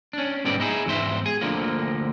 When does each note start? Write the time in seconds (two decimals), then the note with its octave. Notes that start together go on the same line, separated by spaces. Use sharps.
0.13 C#4 D4
0.44 B1 G#2 G3 B3 D5
0.60 D#4 E4 G#4
0.86 E2 G#2 C5 E5
1.26 G#4 G#5
1.41 D2 D3 F3 A#3